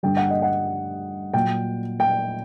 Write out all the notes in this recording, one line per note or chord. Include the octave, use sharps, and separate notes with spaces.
G2 D3 G3 G5
F#5
D#5
F#5
A#2 F#3 G5
G5